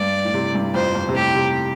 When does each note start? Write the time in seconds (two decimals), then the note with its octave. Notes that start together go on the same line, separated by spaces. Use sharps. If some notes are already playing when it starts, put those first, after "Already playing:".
Already playing: G2 D5
0.25 A2
0.34 C3
0.55 G2
0.75 F2 C5
0.95 F2
1.09 C3
1.15 A2 G4
1.35 C3